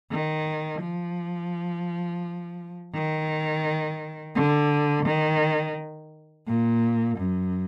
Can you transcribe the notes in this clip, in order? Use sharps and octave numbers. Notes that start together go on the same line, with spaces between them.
D#3
F3
D#3
D3
D#3
A#2
F#2